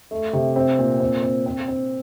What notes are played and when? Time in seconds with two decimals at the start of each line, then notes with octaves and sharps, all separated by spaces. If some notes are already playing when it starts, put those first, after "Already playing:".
0.11 A3
0.33 C3
0.56 C4
0.79 A#2
1.00 C4
1.23 C4
1.46 C4
1.68 C4